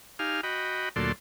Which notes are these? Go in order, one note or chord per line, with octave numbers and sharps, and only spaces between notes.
D#4 G4 F5 G#5 F6
F#4 D#5 G5 B5
D2 A#2 F#3 A4 D5 C6